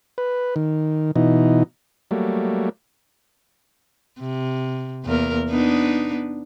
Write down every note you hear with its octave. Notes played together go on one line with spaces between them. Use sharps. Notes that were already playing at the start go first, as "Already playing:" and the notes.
B4
D#3
B2 E3 D#4
F#3 G3 A3 A#3
C3
E2 A#3 A#4
B3 D4 D#4